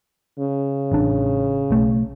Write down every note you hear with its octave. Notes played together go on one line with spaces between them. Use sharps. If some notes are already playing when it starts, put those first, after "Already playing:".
C#3
A1 D4
B1 A3